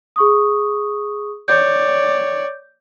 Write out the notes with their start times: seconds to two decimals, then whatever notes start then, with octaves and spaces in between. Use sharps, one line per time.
0.16 G#4 C#6 D#6
1.48 C#5 D5 G6